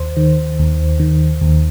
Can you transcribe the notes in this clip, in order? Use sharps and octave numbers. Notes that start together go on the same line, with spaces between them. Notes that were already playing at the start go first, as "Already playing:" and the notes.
Already playing: D#2 C5
D#3
D#2
D#3
D#2